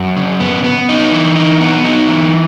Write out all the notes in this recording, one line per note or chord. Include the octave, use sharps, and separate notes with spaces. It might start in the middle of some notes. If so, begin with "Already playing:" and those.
Already playing: F#2
C#3
B3
B3
D#4
E3
D#4
B3
D#4
E3